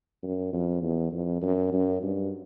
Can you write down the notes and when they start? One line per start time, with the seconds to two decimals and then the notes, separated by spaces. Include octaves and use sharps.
0.23 F#2
0.53 F2
0.82 E2
1.12 F2
1.42 F#2
1.73 F#2
2.03 G2